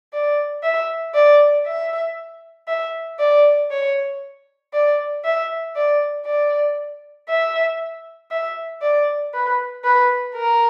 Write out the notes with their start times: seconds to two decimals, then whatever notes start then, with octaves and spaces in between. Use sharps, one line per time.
0.13 D5
0.63 E5
1.14 D5
1.66 E5
2.67 E5
3.19 D5
3.71 C#5
4.73 D5
5.24 E5
5.75 D5
6.26 D5
7.29 E5
8.31 E5
8.81 D5
9.34 B4
9.84 B4
10.35 A#4